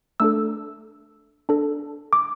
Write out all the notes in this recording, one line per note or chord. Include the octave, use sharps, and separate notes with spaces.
A3 D4 A4 E6
D4 A4
D6